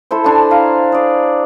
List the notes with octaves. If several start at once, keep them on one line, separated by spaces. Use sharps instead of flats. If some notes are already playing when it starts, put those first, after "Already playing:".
E4 A4 C5
D4 G#5 C6
E4 C5 F5 A#5
G#4 D5